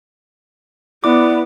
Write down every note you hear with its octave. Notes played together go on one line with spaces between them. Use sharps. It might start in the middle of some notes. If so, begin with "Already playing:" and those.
B3 E4 D5 D6